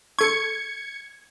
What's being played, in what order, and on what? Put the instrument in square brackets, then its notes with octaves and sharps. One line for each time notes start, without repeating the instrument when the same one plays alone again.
[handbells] A4 C#6 [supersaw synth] G#6 C#7